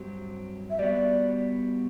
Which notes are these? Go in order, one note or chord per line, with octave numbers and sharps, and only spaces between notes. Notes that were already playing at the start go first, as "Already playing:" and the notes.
Already playing: G2 F#3 C4 G4
E5
G3 B3 F#4 D5